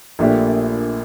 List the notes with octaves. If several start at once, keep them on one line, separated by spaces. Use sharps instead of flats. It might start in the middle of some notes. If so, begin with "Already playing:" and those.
A#1 A#2 A3 D4 G4